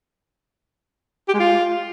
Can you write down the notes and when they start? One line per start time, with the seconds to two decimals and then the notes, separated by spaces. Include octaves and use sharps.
1.29 G4
1.34 G#3
1.40 F4